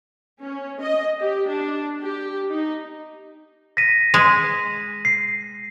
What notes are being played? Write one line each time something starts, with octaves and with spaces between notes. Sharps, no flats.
C#4
D#5
G4
D4
G4
D#4
A#6 B6 D#7
G#3
C7